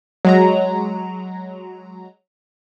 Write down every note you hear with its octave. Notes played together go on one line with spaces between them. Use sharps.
F#3 G#3 A#5